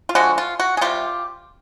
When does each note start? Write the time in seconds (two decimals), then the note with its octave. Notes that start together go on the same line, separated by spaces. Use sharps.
0.09 F4
0.15 D3 F3 G#3 F#4
0.38 F4
0.60 F#4
0.77 G#4
0.81 C3 D#3 G3 F4 G4